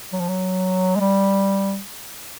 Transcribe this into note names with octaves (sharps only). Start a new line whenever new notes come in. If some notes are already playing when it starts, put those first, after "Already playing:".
F#3
F3
F#3
G#3
G3